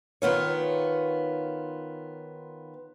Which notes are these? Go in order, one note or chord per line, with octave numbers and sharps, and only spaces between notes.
D#3 B3 F4 C#5